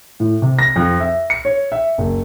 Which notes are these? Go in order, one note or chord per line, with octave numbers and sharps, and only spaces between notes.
A2
C3
A#6
F2
E5
C#7
C#5
E5
F#1